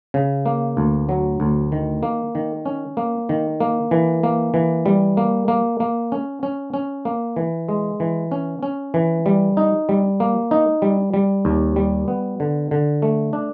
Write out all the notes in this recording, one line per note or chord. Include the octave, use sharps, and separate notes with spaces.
C#3
A#3
D2
F#3
D2
D#3
A#3
D#3
C#4
A#3
D#3
A#3
E3
A#3
E3
G3
A#3
A#3
A#3
C#4
C#4
C#4
A#3
E3
G#3
E3
C#4
C#4
E3
G3
D#4
G3
A#3
D#4
G3
G3
D#2
G3
B3
D3
D3
A3
D4